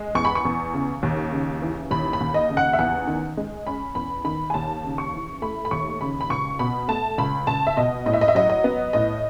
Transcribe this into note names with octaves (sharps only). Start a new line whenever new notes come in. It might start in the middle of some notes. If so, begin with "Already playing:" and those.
Already playing: G#3
E2 C#6
B5
C#6
E2
C#3
D#2
C#3
E3
D#2 B5
B5
D#2
D#5
C#3
F#5
E5
E2 F#5
D#3
G#3
C#4 B5
E2 B5
D#3 B5
G#5
D#2 A5
C#3
C#6
E3
A3 B5
B5
D#2 C#6
C#3 B5
B5
C#2 C#6
B2 B5
A3 A5
C#2 B5
C#2 A5
E5
B2 D#5
A2 D#5
E5
D#5
E5
F#3 D#5
D#5
B3
A2 D#5